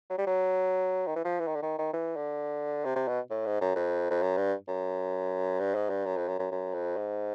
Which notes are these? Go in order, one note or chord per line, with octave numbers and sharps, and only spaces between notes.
F#3
G3
F#3
D#3
E3
F3
E3
D#3
D3
D#3
D#3
E3
D3
C3
C3
B2
A2
G#2
F#2
F2
F2
F#2
G2
F#2
G2
G#2
G2
F#2
F2
F#2
F#2
F#2
F2
G#2